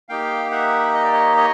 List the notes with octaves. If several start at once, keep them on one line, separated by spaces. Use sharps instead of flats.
A#3 D#4 G4 F5 G5
E5 F#5
D#5
D5
C#5 D#5
C#5 D#5